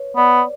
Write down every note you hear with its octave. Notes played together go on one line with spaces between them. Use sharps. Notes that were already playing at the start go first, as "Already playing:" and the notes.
Already playing: B4 C#5
B3 D5